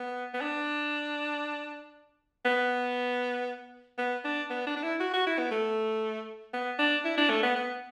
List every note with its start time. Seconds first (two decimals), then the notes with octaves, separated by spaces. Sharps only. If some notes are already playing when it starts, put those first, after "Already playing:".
Already playing: B3
0.34 B3
0.41 D4
2.45 B3
3.98 B3
4.25 D4
4.50 B3
4.67 D4
4.77 D4
4.83 E4
5.00 F#4
5.13 F#4
5.27 E4
5.38 B3
5.51 A3
6.54 B3
6.79 D4
7.05 E4
7.18 D4
7.30 A3
7.43 B3
7.56 B3